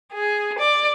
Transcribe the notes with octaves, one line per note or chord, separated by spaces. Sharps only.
G#4
D5